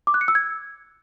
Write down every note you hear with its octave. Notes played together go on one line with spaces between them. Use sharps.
D6
F#6
C#7
E6
G#6